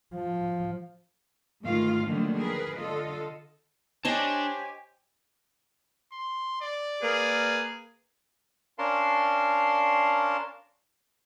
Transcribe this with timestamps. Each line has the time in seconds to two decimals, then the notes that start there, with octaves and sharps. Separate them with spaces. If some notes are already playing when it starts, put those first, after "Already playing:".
0.14 F3
1.63 D2 G#2 D#3 F4 F5
2.07 D3 D#3 F3 F#3 A3 A#3
2.38 G#4 A#4 B4
2.79 D3 F4 A4 D#5
4.05 D4 G4 C5 C#5 D#5 G#5 A5
6.13 C6
6.62 D5
7.03 A#3 G#4 A#4 B4
8.79 C#4 D4 A#4 F5 A5 C6